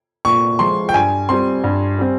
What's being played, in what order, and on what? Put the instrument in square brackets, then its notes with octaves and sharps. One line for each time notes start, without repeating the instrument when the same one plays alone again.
[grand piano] A#2 [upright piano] C#6
[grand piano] F3 G#3 [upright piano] C6
[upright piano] G5
[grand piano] G2 [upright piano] G#5
[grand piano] G3 C4 [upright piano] C6
[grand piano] G2
G3 C4